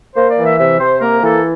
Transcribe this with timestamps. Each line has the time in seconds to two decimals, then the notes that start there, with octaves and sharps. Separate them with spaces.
0.16 A#3 C5
0.31 D5
0.37 E3
0.45 E5
0.59 C3 E5
0.80 C3 C5
1.01 A#3 A#4
1.23 E3 A4